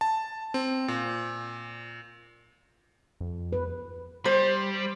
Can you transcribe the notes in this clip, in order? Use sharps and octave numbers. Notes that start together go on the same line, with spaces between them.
A5
C4
A#2
F2
B4
G3 C5